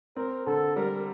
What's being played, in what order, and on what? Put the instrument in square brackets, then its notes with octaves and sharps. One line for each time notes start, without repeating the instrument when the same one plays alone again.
[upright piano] C4 [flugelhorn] A#4
[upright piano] D3 [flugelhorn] A4
[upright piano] G3 [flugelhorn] A#4